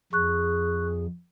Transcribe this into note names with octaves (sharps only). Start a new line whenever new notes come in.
F2 G#4 C#6 F#6